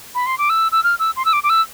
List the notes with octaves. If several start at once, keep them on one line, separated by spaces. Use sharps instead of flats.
B5
C6
D6
E6
E6
F6
E6
C6
E6
D6
D6
E6